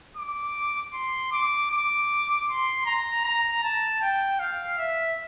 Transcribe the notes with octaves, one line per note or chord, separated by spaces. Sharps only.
D6
C6
D6
D6
C6
A#5
A#5
A5
G5
F5
E5